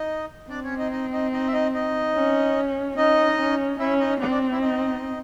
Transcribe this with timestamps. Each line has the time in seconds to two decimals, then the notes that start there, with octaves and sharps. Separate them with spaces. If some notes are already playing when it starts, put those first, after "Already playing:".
Already playing: D#4 D#5
0.50 C4 D4 D5
0.64 C#4 C#5
0.78 D#4 D#5
0.91 D#4 D#5
1.12 D#4 D#5
1.33 D#4 D#5
1.47 E5
1.53 D#4 D#5
1.73 D#4 D#5
2.14 C#4
2.97 C#4 D#4 D#5
3.39 C#4
3.80 C#4 E4 E5
3.99 D#4 D#5
4.20 C4 D4 D5
4.31 D4 D5
4.52 E4 E5
4.61 D#4 D#5